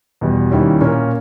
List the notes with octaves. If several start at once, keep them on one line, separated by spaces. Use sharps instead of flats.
E2 B2 G3
D#2 D#3 G3 C#4 E4
A#2 A#3 C#4